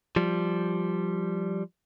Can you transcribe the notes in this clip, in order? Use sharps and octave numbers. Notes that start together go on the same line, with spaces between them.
F3 G3